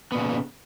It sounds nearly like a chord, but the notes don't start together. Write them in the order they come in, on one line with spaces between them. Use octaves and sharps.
B3 A#2 C#3